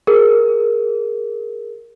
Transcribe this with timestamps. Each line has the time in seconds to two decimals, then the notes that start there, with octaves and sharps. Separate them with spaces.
0.07 G#4 A#4